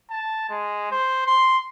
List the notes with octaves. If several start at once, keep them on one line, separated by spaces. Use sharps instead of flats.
A5
G#3
C5
C6